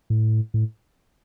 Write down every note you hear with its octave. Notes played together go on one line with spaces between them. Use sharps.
A2
A2